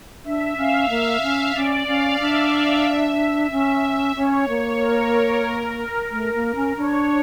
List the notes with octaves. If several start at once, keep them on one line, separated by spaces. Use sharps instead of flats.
D4 E5
C#4 F5
A#3 E5
C#4
C#4 D5
C#4 F5
D4 E5
C#4 E5
C#4 C#5
A#3 C#5
A#4
A3
A#3
C#4
D4 C#5